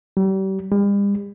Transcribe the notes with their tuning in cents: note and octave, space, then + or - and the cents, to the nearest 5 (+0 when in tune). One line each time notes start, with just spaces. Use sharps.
G3 -35
G3 +45